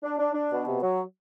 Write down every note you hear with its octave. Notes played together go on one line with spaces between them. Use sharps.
D4
D4
D4
B2
C3
F#3